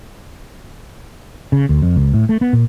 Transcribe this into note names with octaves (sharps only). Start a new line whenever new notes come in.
C#3
D2
F2
C#2
A2
A3
B3
A#2